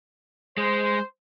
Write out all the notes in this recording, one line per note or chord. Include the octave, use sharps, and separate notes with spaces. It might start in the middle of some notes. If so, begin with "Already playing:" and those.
G#3 C5